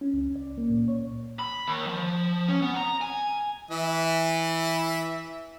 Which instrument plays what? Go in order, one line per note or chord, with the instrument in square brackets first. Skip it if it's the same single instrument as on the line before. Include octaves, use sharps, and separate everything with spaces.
[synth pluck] C#4
C#2
D5
A#3
A#2
C#5
[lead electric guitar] B5
D#2
F3
C#4
B3
A#5
G#5
[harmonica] E3 E5